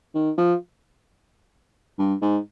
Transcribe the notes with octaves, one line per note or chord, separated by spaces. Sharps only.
D#3
F3
G2
G#2